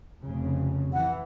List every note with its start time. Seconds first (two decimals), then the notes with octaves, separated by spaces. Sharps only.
0.23 F1 C#3
0.93 E3 F#5